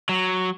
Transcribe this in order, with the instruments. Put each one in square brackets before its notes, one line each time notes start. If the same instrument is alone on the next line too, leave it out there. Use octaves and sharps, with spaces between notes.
[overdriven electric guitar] F#3